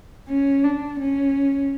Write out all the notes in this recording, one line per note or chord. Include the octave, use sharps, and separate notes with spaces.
C#4
D4
C#4